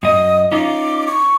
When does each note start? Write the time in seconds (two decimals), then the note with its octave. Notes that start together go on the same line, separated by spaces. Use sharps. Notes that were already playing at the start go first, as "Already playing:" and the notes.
0.03 F#2 D#5 D#6
0.52 C#4 D#4 F4 D6
1.07 C#6